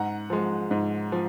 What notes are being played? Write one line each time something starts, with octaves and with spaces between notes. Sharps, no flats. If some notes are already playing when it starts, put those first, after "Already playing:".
Already playing: G#2 F#5 A#5
F3 G#3
G#2
F3